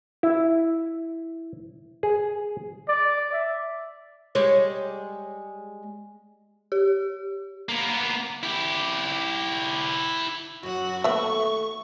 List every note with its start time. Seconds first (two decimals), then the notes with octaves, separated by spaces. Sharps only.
0.23 E4
2.03 G#4
2.88 D5
3.32 E5
4.35 G3 G#3 C#5
6.72 G4
7.69 A#3 B3
8.43 E4 G4
10.63 F#2 F#3 F#4 F#5
11.04 D#2 A3 B3 E5 C#6